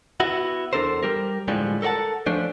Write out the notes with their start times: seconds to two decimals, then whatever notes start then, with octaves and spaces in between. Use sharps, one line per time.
0.20 B3 E4 F#4
0.73 E2 D4 A4 A#4 C5
1.03 G3 G4 A#4
1.48 A2 D3 F3 G3 G#3
1.82 A4 A#4 C#5 F#5 A5
2.26 F3 A3 C#4 D4 C5